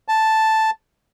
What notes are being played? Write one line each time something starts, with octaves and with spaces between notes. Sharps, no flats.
A5